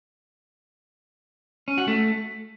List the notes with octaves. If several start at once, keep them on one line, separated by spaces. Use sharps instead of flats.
C#4
F#4
A3